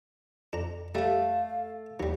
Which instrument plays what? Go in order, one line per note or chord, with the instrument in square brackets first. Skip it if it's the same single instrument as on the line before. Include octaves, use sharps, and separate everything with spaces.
[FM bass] F2 [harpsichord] D4 A#5
[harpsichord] G3 A4 [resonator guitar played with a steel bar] A3 [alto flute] F5
[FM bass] D#2 [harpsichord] F#3 G3